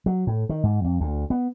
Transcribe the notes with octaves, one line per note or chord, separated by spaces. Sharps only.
F#3
A2
D#3
G#2
F2
D2
B3